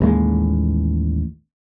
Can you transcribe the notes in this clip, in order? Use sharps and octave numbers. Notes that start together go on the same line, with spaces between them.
A1 D#2 G#3 A#3